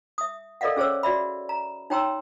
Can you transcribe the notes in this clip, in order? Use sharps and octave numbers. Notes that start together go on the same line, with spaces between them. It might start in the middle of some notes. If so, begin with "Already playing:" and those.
E5 D#6
A4 A#4 D5 D#5 F5 F#5
C#4 G#4 C5 C#5 E6
F#4 D5 E5 B5
A#5
D#4 C#5 G5 A#5 C6 E6